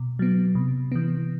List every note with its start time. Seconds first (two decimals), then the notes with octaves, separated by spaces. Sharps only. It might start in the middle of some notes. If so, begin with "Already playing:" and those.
Already playing: B2
0.19 F#3 B3
0.55 C3
0.92 E3 B3